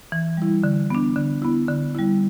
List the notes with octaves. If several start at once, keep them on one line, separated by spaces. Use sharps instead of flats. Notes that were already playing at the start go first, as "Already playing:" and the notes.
E3
G3 E4
D3
B3 D4
D3
B3 E4
D3
G3 E4